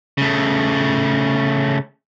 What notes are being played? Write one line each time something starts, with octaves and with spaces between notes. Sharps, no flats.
C#3 A3